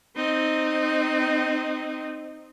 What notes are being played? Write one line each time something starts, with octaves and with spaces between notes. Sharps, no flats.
C4 D#4